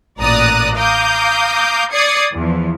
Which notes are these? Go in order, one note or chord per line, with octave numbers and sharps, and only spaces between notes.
A1 A#2 D5 A#5 D#6 F#6
F5 A#5 D6 D#6 G6
D5 D#6 G#6 C7 C#7
E2 F3